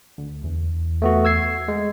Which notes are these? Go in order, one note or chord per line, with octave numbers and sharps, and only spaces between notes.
D2
E2
A3 B3 F#4
E6 G#6 C7
G#3